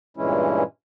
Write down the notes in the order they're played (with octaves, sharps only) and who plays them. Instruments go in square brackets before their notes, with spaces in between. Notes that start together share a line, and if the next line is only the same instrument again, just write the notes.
[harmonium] G2 A#2 E3 G#3 C#4 E4